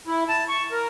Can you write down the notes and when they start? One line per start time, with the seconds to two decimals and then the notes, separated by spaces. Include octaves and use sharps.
0.07 E4
0.29 A5
0.48 C#6
0.72 A#4